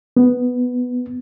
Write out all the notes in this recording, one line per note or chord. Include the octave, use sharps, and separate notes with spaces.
B3